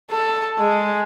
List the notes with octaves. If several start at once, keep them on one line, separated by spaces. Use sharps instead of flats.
A4
G#3